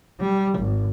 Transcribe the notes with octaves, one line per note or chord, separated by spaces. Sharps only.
G3
G#1